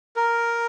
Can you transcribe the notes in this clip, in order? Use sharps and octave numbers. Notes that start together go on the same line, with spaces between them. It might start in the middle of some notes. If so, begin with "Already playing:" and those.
A#4